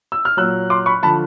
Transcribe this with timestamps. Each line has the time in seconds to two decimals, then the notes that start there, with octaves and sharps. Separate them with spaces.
0.12 E6
0.25 F6
0.37 A#2 F#3 E6 F#6
0.70 C6 D6
0.86 B5 C#6
1.03 D3 F3 A5 B5